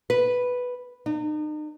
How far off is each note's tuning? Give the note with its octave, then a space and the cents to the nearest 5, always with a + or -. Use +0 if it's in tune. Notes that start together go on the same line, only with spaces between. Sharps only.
B4 +0
D#4 -40